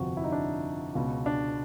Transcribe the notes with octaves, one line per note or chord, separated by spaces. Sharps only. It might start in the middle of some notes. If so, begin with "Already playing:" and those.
Already playing: G1 F2 C3 F3 F#4
E4
D#4
D4
C#2 B2
D4